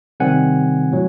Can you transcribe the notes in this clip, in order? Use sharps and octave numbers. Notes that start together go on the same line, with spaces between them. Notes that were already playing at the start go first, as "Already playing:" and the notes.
C3 D#3 G3 C4 F#5 G#5
A2 F#3